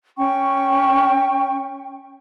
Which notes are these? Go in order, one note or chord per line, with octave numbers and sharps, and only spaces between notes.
C#4 G5 C#6